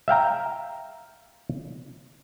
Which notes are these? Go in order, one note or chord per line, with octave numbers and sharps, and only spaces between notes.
E5 F5 G5 A#5